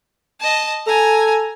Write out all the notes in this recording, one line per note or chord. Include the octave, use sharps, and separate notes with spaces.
D#5 A5
A4 G#5 A#5